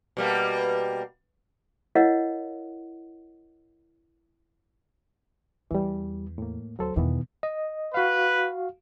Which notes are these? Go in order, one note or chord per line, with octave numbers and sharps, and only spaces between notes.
B2 G3 A#3
E4 A#4 C#5 D#5 F5 F#5
E2 E3 G3
A2 A#3
D2 F#3 A4 C5
E2 B2 D#3 E3 B3
D#5
F#4 B4 F5